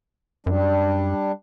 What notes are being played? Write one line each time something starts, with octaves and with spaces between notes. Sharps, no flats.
F#2 G3 D4